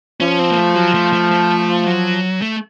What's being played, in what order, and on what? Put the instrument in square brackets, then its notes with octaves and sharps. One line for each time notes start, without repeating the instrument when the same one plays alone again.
[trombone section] F3 [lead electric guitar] C#4
[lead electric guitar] C4
A#3
A3
F#3
A3
A3
A3
F#3
A3